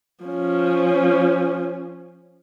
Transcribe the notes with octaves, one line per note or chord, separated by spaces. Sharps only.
F3 C#4